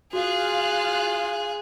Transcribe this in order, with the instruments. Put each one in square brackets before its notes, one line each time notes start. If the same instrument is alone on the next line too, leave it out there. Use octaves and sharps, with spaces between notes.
[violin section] F4 F5 F#6 [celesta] F#4 [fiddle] G#4